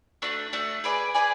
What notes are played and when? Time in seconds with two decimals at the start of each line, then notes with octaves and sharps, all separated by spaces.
0.22 A3 D4 F#4
0.53 A3 D4 F#4
0.84 G#4 B4 D5 G#5
1.15 G#4 B4 D5 G#5